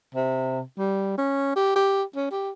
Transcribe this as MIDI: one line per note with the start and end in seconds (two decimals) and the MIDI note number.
0.15 0.62 48
0.78 1.13 55
1.18 1.55 61
1.56 1.73 67
1.75 2.03 67
2.16 2.29 61
2.31 2.50 67